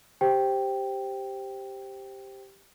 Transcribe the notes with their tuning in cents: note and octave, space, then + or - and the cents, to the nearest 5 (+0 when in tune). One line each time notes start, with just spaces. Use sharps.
G4 +0 C5 +0 G5 +0